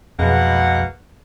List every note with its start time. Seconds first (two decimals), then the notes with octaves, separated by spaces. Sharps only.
0.19 B1 F2 B2 G#3 A#3 B4 F#5